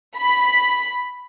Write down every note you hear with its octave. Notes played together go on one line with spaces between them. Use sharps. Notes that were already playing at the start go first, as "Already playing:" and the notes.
B5